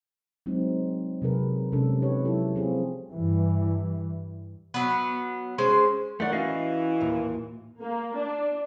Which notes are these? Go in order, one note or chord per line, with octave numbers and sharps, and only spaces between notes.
F#3 G#3 C4 D#4
C3 F#3 G#4 A#4 B4
C3 F3 G#3 C#4 D4 A4
C4 D#4 G4 B4 C#5
F3 F#3 E4 A4
F3 C4 F4 G#4
G2 E3
F#3 B3
G#3 C#4 C5
D#3 A3 C#5 D5 F#5
E3 C#4 F#4 D#5 F5
D#2 A#2
A#3
D4